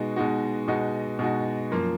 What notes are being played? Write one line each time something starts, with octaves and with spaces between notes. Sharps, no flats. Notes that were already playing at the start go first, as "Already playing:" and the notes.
Already playing: B2 G#3 D#4 F#4
B2 G#3 D#4 F#4
B2 G#3 D#4 F#4
B2 G#3 D#4 F#4
F#2 F3 A#3 F4